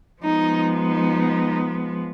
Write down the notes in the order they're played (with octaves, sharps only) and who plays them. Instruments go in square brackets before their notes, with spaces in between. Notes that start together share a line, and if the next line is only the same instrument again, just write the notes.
[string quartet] F3 G#3 B3 D#4
D#4